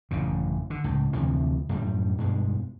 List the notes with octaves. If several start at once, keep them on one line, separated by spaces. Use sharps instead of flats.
A1 F#2 C#3
D3
C#2 A2
D2 C3 E3 F3
F#2 A2 G3
G2 B2 G#3